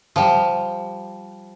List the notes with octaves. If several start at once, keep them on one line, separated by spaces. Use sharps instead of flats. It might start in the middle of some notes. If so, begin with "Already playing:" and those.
F3 G3